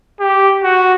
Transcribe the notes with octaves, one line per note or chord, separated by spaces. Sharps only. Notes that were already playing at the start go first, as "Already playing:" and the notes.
G4
F#4